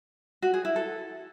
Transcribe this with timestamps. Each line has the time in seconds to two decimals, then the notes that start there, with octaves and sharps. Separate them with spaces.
0.42 F#4
0.54 G#4
0.65 E4
0.76 A4